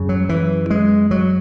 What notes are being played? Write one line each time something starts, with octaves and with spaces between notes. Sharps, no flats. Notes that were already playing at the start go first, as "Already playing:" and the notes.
Already playing: F#2 C#3
F#3
E3
G#3
F#3